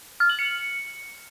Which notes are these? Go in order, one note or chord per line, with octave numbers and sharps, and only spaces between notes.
F6
F#7
C#7